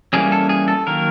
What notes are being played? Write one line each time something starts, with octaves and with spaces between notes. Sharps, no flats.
E3 G3 A#3 C#4 G#4
A4
G#4
A4
D#3 F#3 A#3 A#4